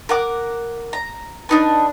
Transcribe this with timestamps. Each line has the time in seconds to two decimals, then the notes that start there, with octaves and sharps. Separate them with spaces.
0.09 A#4 F#5 D6
0.93 A#5
1.49 D4 D#4 B4